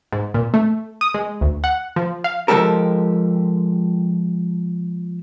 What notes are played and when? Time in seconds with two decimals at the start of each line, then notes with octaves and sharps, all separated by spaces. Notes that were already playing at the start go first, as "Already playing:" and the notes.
0.12 G#2
0.34 A#2
0.54 A3
1.01 D#6
1.14 G#3
1.41 D2
1.64 F#5
1.96 F3
2.24 F5
2.48 F3 G#3 G4 A4 A#4